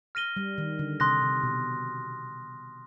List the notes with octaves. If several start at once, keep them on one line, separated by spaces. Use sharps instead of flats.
F6 A#6 D#7 G7
G3
D#3
D3
C3 C6 D#6 F#6 A#6
C3
B2